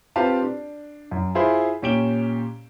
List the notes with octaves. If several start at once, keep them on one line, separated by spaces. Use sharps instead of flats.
C4 F4 G4 B4 F5 A5
D4
F#2
E4 F4 G#4 C5 B5
A#2 C#4 G4 D7 E7 G7